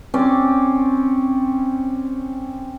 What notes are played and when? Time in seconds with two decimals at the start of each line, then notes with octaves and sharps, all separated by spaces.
0.14 C4 C#4 D5